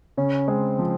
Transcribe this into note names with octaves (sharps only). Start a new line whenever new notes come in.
C#3 C#4
G#3 C4
F3